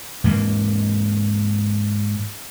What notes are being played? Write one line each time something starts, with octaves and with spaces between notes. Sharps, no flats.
G#2 E3 A#3